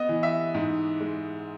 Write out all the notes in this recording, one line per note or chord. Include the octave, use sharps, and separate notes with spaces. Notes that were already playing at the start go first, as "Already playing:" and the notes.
Already playing: B3 D#5 D#6
E3
E5
G#2
G#3